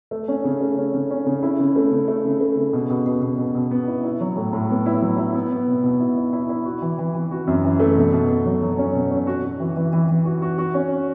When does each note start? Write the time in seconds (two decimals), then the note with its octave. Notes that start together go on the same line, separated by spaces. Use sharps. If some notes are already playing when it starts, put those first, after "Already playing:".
0.11 A3
0.28 C#4
0.44 C#3
0.61 A3
0.78 C#4
0.94 C#3
1.10 C#4
1.26 C#3
1.43 E4
1.59 C#3
1.76 A3
1.92 C#3
2.08 A3
2.25 C#3
2.40 A3
2.57 C#3
2.73 B2
2.90 B2
3.06 B2
3.22 B2
3.38 B2
3.55 B2
3.71 B3
3.87 E4
4.04 E4
4.21 F#3
4.37 A2
4.53 A2
4.70 B3
4.86 E4
5.02 F#3
5.18 E4
5.34 B3
5.51 B3
5.68 B2
5.84 B2
6.00 E4
6.17 E4
6.33 E4
6.49 E4
6.65 F#4
6.82 E3
6.99 E3
7.15 E3
7.31 F#4
7.47 F#2
7.64 E3
7.80 A3
7.96 B2
8.12 B2
8.29 B2
8.46 F#3
8.62 F#3
8.78 C#4
8.94 B2
9.11 C#4
9.27 F#4
9.44 F#4
9.60 E3
9.76 E3
9.93 E3
10.09 E3
10.25 F#4
10.42 F#4
10.58 F#4
10.74 C#4